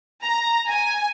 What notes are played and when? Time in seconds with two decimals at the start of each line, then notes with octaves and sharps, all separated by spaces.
0.24 A#5
0.69 G#5